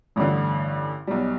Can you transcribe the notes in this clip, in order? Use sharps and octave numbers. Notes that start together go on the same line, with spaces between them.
A1 G2 D3
B1 B2 G3